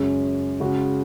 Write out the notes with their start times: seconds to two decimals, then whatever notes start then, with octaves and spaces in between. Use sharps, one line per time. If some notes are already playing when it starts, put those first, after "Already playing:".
Already playing: F#2 C#3 G#3 C#4
0.60 C#3 G#3 F#4